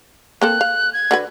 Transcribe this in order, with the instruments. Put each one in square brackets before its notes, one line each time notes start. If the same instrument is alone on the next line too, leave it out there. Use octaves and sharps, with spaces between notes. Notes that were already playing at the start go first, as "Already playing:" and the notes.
[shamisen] A#3 C4 A4 [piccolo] F#6
[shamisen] F5
[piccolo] G#6
[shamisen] D3 F#4 B4